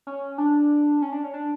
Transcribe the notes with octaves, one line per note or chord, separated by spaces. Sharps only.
C#4
D4
C#4
D4
C#4
D4